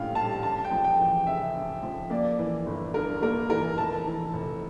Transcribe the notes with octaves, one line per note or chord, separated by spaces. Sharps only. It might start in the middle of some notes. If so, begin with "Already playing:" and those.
Already playing: A#1 A2 G3 C#4 F5 G5
G3 A5
C#4 A5
G5
F3
G5
E2
C#3 E5
C#4
F3
A#3 D5
E3
G1
G2 A#4
A#3 A#4
E3 A#4
F1 A5
E3
F1